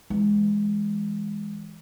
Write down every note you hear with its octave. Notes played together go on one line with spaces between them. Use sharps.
E3 G#3